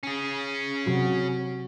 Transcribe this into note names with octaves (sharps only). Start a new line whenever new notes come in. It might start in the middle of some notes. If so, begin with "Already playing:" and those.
C#4 G#4
C3 F#3 F#4